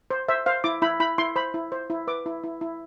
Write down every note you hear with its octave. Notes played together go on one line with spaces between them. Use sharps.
C5
C5 E5
C5 F5
E4 D6
E4 B5
E4 B5
E4 C6
C5 B5
E4
C5
E4
B4 D6
E4
E4
E4